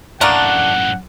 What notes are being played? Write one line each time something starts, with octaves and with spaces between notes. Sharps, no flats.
F#2 A2 A3 A#3 D4 F#5